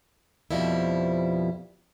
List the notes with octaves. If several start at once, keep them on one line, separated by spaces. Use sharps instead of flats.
F2 B2 F3 G3 E4